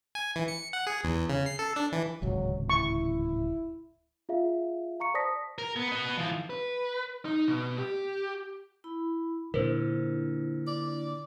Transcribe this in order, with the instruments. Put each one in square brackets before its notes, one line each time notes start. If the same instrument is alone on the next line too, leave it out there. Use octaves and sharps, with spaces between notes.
[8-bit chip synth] G#5
E3
C#7
F#5
G#4
E2
C#3
C7
A4
D4
E3
[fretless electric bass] D1 G#1 C#2 [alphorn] F#3
[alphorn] E4 [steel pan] C#6
[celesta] F4 G#4 E5 F5
F5 A#5 C#6 C#7
C5 D5 A5 D#6 A#6 B6
[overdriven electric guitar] A#4
B3
B3 D#5
E3 F3
[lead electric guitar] B4
D#4
B2
G4
[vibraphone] E4 B5
[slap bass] A#2 D3 [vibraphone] D4 E4 [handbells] A#4 C5
[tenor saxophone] D5